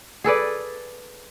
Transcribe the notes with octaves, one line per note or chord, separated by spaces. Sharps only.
G#4 A4 B4 D5